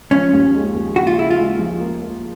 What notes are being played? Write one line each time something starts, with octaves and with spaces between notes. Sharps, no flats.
F3 C#4
D#2
G#3
D#2
C#3 F#4
F4
C#3 E4
F4
G#3
F3
A#3
A#3